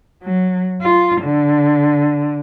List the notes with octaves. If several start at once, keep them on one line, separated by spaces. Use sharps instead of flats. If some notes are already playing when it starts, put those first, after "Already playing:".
F#3
F4
D3